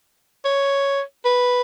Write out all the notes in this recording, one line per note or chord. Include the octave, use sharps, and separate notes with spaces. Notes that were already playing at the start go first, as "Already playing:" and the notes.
C#5
B4